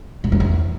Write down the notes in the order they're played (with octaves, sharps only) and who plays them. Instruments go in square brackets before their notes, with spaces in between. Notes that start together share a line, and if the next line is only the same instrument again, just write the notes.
[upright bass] A2
F#2
E2